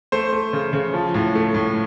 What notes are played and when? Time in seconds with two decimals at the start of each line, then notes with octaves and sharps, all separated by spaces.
0.12 A3 C5
0.32 A3
0.53 C#3
0.73 C#3
0.94 F3
1.14 A2
1.35 A3
1.55 A2